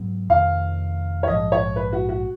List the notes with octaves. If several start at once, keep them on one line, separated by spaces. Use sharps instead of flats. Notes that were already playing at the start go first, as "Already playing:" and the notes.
Already playing: G#2 F#3 B3
F1 F2 D#3 F5
C#5
A#1 G#2 F3 D#5
C#5
B4
F#4
F#4